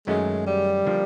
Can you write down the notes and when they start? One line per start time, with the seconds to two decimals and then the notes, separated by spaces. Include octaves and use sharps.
0.07 F#2 D#3 F#3 G#3 A3 C#4
0.46 G3
0.86 D3 F3 A#3 D4